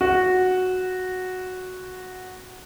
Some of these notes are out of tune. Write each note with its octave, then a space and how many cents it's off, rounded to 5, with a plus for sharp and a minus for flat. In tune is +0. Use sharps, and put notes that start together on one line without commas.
F#4 -5